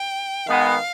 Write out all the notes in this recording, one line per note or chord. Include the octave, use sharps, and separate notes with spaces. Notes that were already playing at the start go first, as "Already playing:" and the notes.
Already playing: G5
D#3 G#3 B3 F5